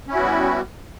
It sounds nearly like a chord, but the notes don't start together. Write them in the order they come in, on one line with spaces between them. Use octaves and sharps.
C#4 E4 F#4 B3 G3